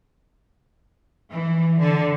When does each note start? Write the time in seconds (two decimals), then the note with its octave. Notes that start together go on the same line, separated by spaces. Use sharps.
1.31 E3
1.80 D3